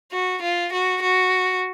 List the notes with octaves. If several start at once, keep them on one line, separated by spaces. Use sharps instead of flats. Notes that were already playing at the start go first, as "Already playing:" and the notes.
F#4
F4
F#4
F#4